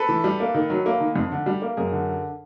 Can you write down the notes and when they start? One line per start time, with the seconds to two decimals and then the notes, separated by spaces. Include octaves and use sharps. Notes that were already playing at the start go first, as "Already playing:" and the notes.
Already playing: A4 B4
0.09 E3
0.24 G3
0.40 A#3
0.54 D#3
0.70 F#3
0.86 A#3
1.00 D#3
1.16 F2
1.32 D3
1.46 G3
1.62 A#3
1.77 F#2 G#4 A#4
1.92 D3